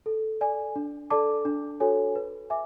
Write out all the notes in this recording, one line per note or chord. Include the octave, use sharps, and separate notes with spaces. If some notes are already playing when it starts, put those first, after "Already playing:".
A4
D5 G#5
D4
A4 D5 A5 D6
D4
F#4 A4 C#5 G#5
B4
E5 G#5 D6